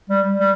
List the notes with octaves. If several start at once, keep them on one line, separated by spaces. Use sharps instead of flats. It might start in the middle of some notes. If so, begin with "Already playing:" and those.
G3
G3